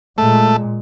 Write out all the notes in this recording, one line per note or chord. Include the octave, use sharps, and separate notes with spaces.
A#2 G#3 A3